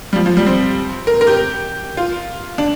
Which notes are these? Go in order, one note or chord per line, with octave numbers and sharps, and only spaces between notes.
G3
F3
F3
G3
C4
A#4
A#4
G4
F4
D4